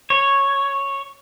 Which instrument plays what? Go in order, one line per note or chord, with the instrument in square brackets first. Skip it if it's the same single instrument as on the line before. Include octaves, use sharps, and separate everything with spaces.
[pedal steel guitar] C#5